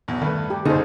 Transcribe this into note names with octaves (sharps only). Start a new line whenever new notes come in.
B1 E2
G2 D#3 A3 B4
G4
F#1 C2 D3 D#4 G#4 A4 C5